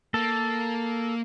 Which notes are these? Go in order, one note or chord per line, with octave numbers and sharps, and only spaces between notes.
A#3 A4